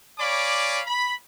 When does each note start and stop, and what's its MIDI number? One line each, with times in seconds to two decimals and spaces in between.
0.19 0.80 73
0.19 0.80 74
0.19 0.80 77
0.19 0.80 80
0.19 0.80 83
0.19 0.80 86
0.87 1.13 83